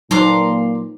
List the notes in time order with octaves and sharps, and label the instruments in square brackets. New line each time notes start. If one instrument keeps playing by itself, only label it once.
[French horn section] A#2 [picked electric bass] F#3 [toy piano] D#4 B4 C5 [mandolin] A#5 C6 D6